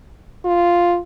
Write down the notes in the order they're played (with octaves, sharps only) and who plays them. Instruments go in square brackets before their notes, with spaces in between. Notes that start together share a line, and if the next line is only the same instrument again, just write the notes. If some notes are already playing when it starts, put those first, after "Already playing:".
[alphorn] F4